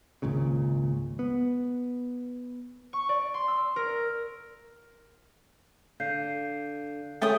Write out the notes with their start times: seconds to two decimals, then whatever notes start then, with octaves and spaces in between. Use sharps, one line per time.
0.22 G#1 C#2 A#2 C#3
1.19 B3
2.93 C#6
3.09 D5
3.34 C6
3.48 E6
3.76 A#4
6.00 D3 F5 G6 C7
7.22 A3 C#4 G#4 A#4 G5 D#6